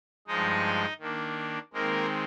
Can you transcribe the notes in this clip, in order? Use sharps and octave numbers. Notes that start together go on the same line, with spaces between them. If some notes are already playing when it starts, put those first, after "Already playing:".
G2 F3 G#3 D#4 D#5
D#3 A#3 D4
D#3 G#3 A#3 C4 A#4